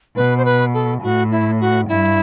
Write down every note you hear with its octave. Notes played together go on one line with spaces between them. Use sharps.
B2 B4
C5
B4
A4
A2 F#4
E4
F#4
G2 E4